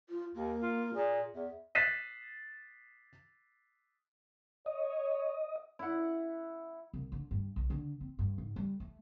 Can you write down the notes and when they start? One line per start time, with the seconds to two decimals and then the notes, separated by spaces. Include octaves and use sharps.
0.09 F4
0.35 D#2 A#3
0.62 F4
0.94 A#2 G#4
1.35 E2 E5
1.75 F#6 A6 B6 C7 D#7 E7
4.66 C#5 D#5
5.79 E4 F#5
6.94 C2
7.12 D3
7.31 G2
7.56 B1
7.70 D3
8.01 C4
8.19 G2
8.38 G#2
8.56 G3
8.80 A3